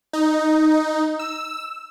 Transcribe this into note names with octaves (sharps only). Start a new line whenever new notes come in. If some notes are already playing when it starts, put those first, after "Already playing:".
D#4
E6